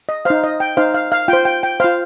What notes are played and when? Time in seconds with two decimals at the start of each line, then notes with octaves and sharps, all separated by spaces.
0.09 D#5
0.25 D#4 C5 F5
0.44 D#5
0.60 G5
0.77 D#4 C5 F5
0.94 F5
1.12 F5
1.28 F4 C5 G5
1.45 G5
1.63 G5
1.80 F4 C5 F5